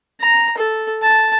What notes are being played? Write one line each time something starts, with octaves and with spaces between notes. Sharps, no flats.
A#5
A4
A5